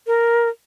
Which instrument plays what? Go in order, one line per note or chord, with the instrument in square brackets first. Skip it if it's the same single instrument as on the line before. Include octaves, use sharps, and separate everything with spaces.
[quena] A#4